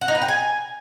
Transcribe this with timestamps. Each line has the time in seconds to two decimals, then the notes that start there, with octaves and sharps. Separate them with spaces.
0.01 F#5
0.08 D#4
0.15 B4
0.22 G5
0.28 G#5